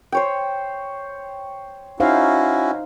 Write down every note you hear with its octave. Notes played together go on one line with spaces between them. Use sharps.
C5 C#5 G5
C#4 D#4 E4 F#4 C5 F5